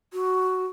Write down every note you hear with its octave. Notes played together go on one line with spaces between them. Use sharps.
F#4